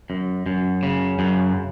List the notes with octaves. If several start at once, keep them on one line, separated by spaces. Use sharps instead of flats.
F#2
F#2
C#3
F#2